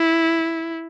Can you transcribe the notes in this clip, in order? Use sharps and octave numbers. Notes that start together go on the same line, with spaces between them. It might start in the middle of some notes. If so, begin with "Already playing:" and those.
Already playing: E4